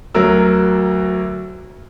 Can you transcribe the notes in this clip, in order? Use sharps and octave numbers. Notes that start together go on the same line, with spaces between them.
D2 F#3 A#4 E6